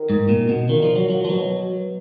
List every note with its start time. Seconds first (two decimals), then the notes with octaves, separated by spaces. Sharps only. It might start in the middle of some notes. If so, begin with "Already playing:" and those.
Already playing: D#3
0.10 G#2
0.29 A#2
0.49 B2
0.69 A#2 D#3
0.83 F3
0.96 F#3
1.10 A#2 F#3
1.25 F3
1.29 B2 F#3